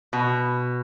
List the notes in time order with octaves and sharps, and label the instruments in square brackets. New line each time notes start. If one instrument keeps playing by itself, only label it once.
[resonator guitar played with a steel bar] B2